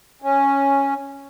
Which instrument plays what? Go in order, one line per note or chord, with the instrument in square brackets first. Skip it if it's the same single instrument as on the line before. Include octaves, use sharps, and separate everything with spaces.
[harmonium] C#4